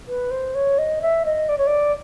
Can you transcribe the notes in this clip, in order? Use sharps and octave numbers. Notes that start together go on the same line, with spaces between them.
B4
C5
C#5
D#5
E5
D#5
D5
C#5
D5